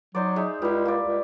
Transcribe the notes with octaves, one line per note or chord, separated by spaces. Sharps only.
F#3 D#4 C5 D5
G#3 D#4 E5
C#2 G3 E4
A#3 D5
C#2